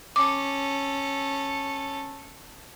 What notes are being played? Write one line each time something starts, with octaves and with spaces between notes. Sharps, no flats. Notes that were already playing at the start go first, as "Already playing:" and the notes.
C#4 A4 D6